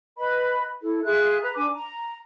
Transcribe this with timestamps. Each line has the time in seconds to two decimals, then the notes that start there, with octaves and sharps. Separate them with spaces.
0.18 B4 D#5 B5
0.82 E4 A4
1.04 F4 G#4 E5 F#6
1.42 B4 A#5
1.55 D4 G#5 D6
1.74 A#5